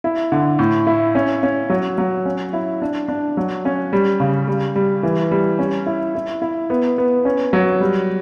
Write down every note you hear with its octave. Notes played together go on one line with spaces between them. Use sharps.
E4
D3
A2
E4
C#4
C#4
F#3
F#3
C#4
E4
D4
D4
F#3
C#4
G3
C#3
G3
G3
E3
G3
C#4
E4
E4
E4
B3
B3
C#4
F#3
G3